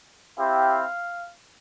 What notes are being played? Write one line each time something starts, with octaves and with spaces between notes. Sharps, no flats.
C4 E4 G4 F5